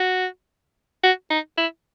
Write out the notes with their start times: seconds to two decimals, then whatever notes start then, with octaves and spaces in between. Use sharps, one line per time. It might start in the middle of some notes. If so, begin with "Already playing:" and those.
Already playing: F#4
1.03 F#4
1.30 D#4
1.57 E4